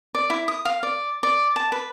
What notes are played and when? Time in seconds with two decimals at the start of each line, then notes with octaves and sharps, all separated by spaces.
0.15 D5
0.30 E4
0.48 D#6
0.65 F5
0.83 D5
1.23 D5
1.56 A5
1.72 B4